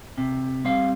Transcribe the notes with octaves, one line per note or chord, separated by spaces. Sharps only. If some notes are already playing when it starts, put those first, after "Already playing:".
C3
G3 C4 F5